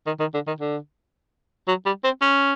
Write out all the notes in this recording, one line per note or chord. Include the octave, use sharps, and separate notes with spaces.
D#3
D#3
D3
D#3
D3
F#3
G3
C4
C#4